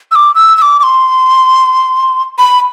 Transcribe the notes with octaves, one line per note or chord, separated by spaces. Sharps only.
E6
D6
E6
E6
D6
D6
C6
B5